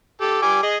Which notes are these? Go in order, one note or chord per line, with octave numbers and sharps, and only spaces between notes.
G4 A4
G3 G#5 D6
G#4 D#5